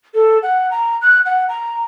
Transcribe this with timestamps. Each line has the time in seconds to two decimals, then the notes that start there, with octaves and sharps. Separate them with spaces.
0.14 A4
0.43 F#5
0.71 A#5
1.02 F#6
1.26 F#5
1.49 A#5